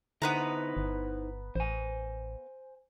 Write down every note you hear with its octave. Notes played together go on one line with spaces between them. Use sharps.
D3 B3 D#4 E4 B4 C5 A#5
G1
A1 C5 G#5